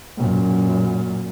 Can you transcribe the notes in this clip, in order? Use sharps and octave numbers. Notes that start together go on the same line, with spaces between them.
F#2 A#2